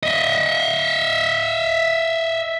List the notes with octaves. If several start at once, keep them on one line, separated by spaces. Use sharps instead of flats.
D#5 E5